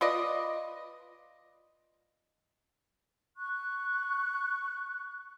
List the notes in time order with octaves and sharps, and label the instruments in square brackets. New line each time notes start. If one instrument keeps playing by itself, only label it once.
[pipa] F4 B4 D5 D#5
[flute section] C#6 F#6